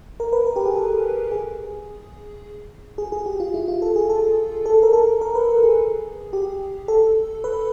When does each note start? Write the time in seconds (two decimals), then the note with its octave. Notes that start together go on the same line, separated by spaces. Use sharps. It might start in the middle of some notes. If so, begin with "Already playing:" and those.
0.20 A#4
0.33 B4
0.46 A#4
0.56 G4
0.66 G#4
0.76 A4
1.31 G#4
2.98 G#4
3.12 G#4
3.26 G4
3.40 F4
3.54 E4
3.68 F4
3.82 A4
3.96 G#4
4.09 A4
4.66 A4
4.83 A#4
4.93 A4
5.21 A#4
5.35 B4
5.49 A#4
5.63 G#4
6.33 G4
6.88 A4
7.44 B4